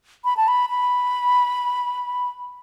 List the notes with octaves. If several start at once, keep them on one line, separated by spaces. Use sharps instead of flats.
B5
A5
B5
B5